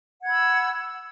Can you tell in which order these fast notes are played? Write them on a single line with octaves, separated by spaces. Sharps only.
F#5 G#6 B5 E6